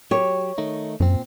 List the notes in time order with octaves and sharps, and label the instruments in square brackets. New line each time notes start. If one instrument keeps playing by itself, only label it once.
[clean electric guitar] F#3 G4 [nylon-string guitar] C#5
[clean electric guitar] D#3 A3 D#4
[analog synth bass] F#2 [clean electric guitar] A#2 C4